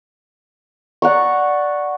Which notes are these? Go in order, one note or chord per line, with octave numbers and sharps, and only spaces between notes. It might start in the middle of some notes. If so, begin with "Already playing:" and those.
D5 F#5 A#5 C#6